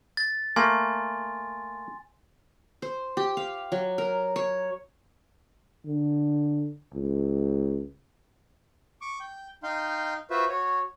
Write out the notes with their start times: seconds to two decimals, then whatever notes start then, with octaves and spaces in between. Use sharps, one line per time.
0.17 A6
0.56 A3 A#3 G#5 C6
2.82 C5
3.17 G4
3.37 F5
3.72 F#3
3.98 A#4
4.36 C#5
5.86 D3
6.94 C#2
9.01 C#6 D6
9.20 G5
9.63 D#4 F5 G5 C6
10.30 F4 F#4 B4 C5 E5
10.49 F#4 C#5